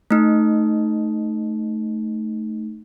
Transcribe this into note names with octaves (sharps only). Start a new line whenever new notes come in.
A3 D#4